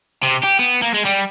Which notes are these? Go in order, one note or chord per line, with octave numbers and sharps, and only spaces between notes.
C3
G4
B3
A#3
G#3
G3